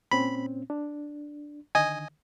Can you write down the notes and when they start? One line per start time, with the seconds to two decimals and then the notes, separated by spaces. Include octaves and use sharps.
0.11 A#2 C4 C#4 B5
0.70 D4
1.75 D3 D#3 D#5 G#5